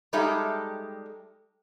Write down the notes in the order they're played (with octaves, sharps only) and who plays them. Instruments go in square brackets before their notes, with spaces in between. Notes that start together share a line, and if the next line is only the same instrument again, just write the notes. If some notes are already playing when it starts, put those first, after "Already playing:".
[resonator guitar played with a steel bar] G3 G#3 D#4 G4 A4 E5